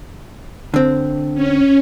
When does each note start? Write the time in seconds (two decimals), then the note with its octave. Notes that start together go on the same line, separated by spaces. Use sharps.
0.74 D3 C4
1.34 C#4